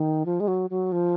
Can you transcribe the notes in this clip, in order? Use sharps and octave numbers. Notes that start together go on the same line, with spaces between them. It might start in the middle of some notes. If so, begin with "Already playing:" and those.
Already playing: D#3
F3
G#3
F#3
F#3
F3